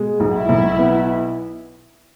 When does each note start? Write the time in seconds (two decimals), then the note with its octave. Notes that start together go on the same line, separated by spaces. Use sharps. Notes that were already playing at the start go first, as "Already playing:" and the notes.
Already playing: B2 G#3
0.20 B1
0.34 E4
0.49 B1
0.79 B3